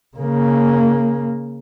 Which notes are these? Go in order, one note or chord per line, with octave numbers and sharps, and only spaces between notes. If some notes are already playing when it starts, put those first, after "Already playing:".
C#3 A#3